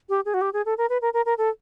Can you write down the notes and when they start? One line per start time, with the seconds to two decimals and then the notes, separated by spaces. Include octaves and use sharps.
0.09 G4
0.25 G#4
0.34 F#4
0.41 G4
0.53 G#4
0.66 A4
0.78 A#4
0.89 B4
1.02 A#4
1.14 A#4
1.26 A#4
1.38 A4